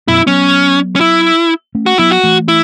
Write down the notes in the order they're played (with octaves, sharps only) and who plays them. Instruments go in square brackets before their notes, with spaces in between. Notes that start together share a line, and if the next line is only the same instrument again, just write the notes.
[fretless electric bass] F#2 B2 [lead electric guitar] E4
[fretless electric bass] F#3 B3 [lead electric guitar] C#4
[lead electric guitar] C#4
E4
[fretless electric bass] A3 C#4
[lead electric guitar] F#4
[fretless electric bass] F#3 B3 [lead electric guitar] E4
[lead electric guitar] F#4
[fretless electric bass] E3 A3
[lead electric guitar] E4